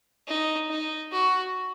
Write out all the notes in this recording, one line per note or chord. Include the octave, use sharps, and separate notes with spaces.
D#4
D#4
F#4